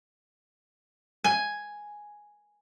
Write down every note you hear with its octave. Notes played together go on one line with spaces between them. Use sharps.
G#5